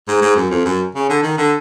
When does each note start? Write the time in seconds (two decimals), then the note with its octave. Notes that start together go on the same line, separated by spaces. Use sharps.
0.08 G#2
0.22 G#2
0.36 F#2
0.51 F2
0.65 F#2
0.95 C#3
1.09 D3
1.23 D#3
1.38 D3